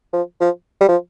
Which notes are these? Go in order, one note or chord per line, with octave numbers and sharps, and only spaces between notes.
F3
F3
G3
F3